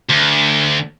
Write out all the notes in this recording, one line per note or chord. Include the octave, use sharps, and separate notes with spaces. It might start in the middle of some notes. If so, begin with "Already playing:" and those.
D2